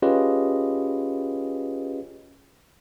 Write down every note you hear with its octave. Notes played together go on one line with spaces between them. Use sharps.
C#4 F4 G4 G#4 B4 D#5